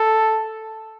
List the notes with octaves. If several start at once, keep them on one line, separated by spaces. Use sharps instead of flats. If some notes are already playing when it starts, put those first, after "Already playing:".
Already playing: A4